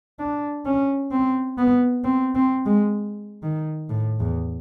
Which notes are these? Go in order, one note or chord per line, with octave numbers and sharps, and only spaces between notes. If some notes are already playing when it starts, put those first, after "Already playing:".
D4
C#4
C4
B3
C4
C4
G#3
D#3
A2
E2